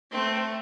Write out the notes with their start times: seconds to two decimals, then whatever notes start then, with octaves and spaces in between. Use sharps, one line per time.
0.11 A3 C4